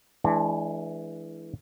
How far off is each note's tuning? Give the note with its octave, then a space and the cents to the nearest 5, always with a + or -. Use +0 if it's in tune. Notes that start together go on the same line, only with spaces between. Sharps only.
E3 +0 G#3 +35 D4 +0